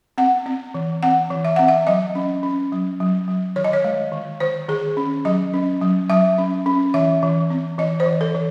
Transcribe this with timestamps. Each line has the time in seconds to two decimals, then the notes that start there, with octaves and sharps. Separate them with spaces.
0.18 C4 F#5
0.46 C4
0.74 E3
1.03 C4 F#5
1.31 E3
1.45 E5
1.56 C4 F#5
1.68 E5
1.87 F#3 D#5
2.15 C#4
2.43 C#4
2.72 F#3
3.00 F#3
3.28 F#3
3.56 D#3 C#5
3.64 D#5
3.73 C#5
3.84 G#3
4.12 D#3
4.40 D#3 C5
4.69 D#3 G#4
4.97 C#4
5.25 F#3 D#5
5.54 C#4
5.81 F#3
6.10 F#3 E5
6.38 C#4
6.66 C#4
6.94 E3 E5
7.23 E3
7.50 C4
7.78 E3 D#5
8.00 C5
8.06 E3
8.21 A4
8.35 E3